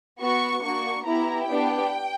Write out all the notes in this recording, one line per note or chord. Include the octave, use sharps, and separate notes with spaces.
B3 F#4 C#6
A#3 D4 F#4 C#6
B3 E4 G4 A#5
B3 D4 G4 G5